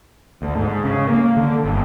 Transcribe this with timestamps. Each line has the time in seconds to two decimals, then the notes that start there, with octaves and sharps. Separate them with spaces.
0.42 D2
0.56 G#2
0.84 C#3
1.09 A#3
1.37 D3
1.64 G1